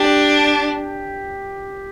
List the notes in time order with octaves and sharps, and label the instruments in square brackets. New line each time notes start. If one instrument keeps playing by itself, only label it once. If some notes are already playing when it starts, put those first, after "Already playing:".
Already playing: [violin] D4 [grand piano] G4